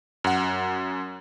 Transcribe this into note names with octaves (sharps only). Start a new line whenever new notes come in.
F#2 F#5